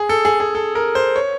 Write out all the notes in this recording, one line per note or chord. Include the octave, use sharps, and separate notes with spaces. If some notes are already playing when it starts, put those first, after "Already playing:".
Already playing: G#4
A4
G#4
G#4
A4
A#4
C5
C#5